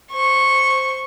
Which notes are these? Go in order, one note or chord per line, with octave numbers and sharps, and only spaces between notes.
C5 C#6